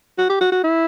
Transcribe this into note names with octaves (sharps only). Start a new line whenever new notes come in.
F#4
G4
F#4
F#4
E4